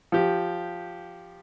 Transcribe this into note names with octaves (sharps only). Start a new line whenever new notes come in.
F3 G4